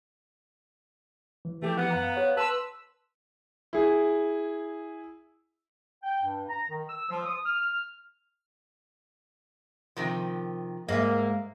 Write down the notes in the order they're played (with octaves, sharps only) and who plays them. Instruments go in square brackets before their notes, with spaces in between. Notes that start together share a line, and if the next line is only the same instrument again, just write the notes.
[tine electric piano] E3
[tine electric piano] E3 F3 [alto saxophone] A3 [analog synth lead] G4
[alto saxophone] B3 [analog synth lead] F#5
[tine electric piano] F#2 F5 A#5
G4 C#5 F5
[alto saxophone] B4 [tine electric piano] A5 C6 [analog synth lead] E6
[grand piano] E4 G#4
[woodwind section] G5
G2
A#5
D#3
E6
F3
D#6
F6
[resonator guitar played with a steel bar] C3 D#3 F3
[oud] G#2 [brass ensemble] A#3 [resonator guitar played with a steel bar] D#5 E5